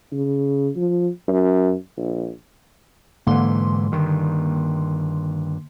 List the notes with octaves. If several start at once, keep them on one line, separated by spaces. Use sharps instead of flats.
C#3
F3
F#2
A#1
G#2 D3 E3 A#3 C6
G2 D#3